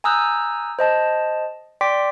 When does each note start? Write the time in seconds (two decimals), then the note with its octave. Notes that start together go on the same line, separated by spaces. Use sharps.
0.04 G#5 A#5 D#6 E6 F#6 G6
0.79 C5 D#5 A5
1.81 D5 G5 C6 D6 B6